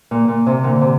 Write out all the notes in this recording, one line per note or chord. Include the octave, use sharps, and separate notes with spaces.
A#2
A#2
C3
A#2 D3
C3